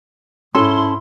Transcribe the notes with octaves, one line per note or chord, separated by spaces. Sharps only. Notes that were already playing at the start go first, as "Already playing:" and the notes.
G#2 C#4 E4 A4 C6